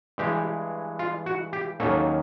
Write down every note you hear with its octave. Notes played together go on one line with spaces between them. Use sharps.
G2 E3 G#3 G4
F4
F#4
G4
D#2 D#3 F#3 A#3 C#4 A4